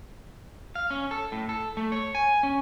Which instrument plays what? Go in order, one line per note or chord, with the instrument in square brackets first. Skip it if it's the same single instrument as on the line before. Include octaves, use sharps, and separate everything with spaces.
[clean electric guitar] F5
C#4
A4
A2
A4
A3
C#5
G#5
C#4